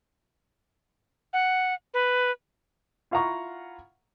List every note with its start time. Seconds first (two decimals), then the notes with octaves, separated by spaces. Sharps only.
1.33 F#5
1.94 B4
3.11 E4 F4 F5 F#5 A#5 C#6